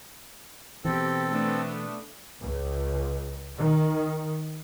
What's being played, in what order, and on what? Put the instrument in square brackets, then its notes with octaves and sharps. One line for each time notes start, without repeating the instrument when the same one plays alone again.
[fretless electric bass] B2 E3 [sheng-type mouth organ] C4 A4 [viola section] G4
[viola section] A3 B3 D4
[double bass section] C#2
D#3